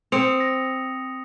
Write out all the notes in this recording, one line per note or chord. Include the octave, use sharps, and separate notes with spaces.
C4 D#6 C#7 F7
A#6